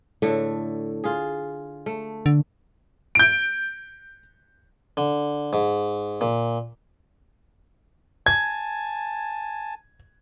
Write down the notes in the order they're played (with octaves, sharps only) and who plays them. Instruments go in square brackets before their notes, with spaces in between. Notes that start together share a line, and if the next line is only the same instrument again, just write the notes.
[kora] A2 D3 A3
F4 G#4
A3
[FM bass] D3
[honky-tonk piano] G6 D7
[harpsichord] D3
G#2
A#2
[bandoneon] G#5 A5 [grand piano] G#6